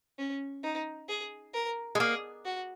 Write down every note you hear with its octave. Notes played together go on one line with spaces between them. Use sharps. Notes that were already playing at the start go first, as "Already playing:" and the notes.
C#4
D#4
G#4
A#4
G#3
A#3 G#4
F#4